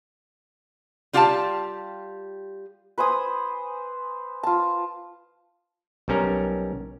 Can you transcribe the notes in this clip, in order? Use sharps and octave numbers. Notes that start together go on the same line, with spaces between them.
G3 F4 G4 F5 G5 A5
B4 C5 G#5 D#6
F4 A5
B1 G3 C#4 A#4